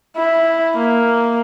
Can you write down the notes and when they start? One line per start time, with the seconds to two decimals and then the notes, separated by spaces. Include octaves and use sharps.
0.17 E4
0.77 A#3